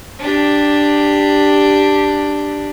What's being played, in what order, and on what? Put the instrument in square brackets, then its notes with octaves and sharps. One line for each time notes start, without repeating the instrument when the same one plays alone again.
[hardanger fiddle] D4 G4